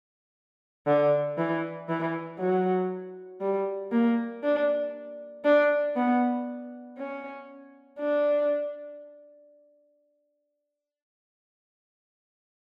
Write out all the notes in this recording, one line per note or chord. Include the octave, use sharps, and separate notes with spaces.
D3
E3
E3
F#3
G3
A#3
D4
D4
B3
C#4
D4